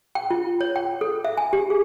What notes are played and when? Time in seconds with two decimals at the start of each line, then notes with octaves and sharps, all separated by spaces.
0.15 G5
0.31 F4
0.61 C#5
0.76 G5
1.01 A4
1.25 E5
1.37 G#5
1.53 G4
1.70 G#4